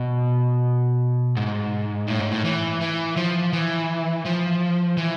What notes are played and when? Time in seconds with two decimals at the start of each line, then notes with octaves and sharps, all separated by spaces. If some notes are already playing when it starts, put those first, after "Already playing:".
Already playing: B2
1.37 G#2
2.08 A2
2.20 G#2
2.32 A2
2.45 E3
2.81 E3
3.17 F3
3.53 E3
4.25 F3
4.97 E3